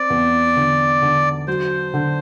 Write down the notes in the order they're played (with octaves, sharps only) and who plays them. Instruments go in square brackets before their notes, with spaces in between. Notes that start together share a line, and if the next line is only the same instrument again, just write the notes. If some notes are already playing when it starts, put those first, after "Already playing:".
Already playing: [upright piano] C4 [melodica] D5
[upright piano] E2
D3
D3
[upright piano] F#3 [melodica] C5
[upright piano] D3